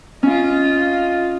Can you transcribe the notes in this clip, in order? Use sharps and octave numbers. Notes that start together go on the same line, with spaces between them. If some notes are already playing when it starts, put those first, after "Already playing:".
C#4 F4 D#5